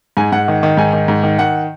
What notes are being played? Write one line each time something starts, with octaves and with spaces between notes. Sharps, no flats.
G#2 G#5
G#2 F#5
D#3
D#3
G#2 G#5
D#3
G#2
D#3
D#3 F#5